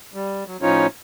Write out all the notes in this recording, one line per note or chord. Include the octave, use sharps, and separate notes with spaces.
G3
F#3
A2 F3 C#4 D#4 F4 C#5